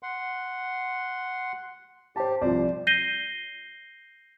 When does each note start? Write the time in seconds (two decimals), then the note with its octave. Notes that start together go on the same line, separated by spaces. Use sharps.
0.03 F#5 C6
2.16 G4 C5 A5
2.41 C2 F3 C5 D5
2.87 G6 A#6 C7 D#7 G7